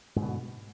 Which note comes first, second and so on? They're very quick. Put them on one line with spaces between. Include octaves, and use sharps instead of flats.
G#2 D3 B2